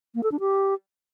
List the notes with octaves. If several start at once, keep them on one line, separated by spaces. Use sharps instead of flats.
A#3
A4
D4
G4